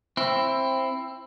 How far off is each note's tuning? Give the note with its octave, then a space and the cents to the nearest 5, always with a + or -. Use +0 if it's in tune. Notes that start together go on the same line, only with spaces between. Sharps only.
C4 +15 E4 +15